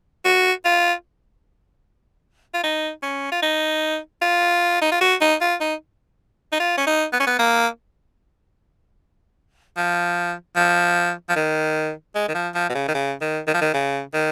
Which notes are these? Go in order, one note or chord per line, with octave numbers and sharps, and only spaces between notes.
F#4
F4
F4
D#4
C#4
F4
D#4
F4
D#4
F4
F#4
D#4
F4
D#4
D#4
F4
C#4
D#4
B3
C#4
B3
A#3
F3
F3
F3
D#3
G#3
D#3
F3
F3
B2
C#3
D#3
C#3
D#3
D#3
F3
D#3
C#3
D#3